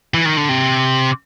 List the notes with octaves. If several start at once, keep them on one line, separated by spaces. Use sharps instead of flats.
E3
D#3
D3
C3